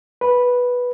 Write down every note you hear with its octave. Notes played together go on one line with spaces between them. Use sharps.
B4